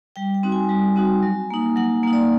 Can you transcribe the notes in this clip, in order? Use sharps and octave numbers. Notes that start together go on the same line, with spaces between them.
G3 G5
G5
C4 D#4 F#4
G#5
G3
C4 D#4 F#4
F#3
A#3 D#4
F#3 F#5
A#3 D#4
D5